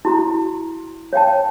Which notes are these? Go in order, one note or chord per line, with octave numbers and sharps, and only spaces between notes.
E4 F#4 A#5
C#5 F5 G5 A5